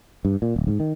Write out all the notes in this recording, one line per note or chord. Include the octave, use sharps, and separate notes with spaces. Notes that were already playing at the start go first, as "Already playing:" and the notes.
G2
A#2
D1
G#2
D#3